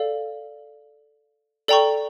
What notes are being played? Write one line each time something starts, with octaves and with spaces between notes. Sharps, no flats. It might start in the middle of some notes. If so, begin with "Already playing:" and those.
Already playing: A4 D5 F5
A4 D5 G5 A#5 C#6